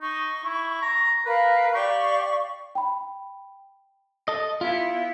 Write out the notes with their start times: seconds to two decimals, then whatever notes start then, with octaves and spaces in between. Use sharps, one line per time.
0.01 D#4 C#6
0.44 E4
0.82 A#5
1.25 A#4 B4 F5
1.74 G4 D5 F5 C#6
2.75 G5 B5
4.28 A4 D#5
4.61 B3 E4 F4